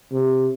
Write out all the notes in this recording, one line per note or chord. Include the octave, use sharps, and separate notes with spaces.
C3